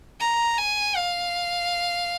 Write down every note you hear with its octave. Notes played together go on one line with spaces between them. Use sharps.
A#5
G#5
F5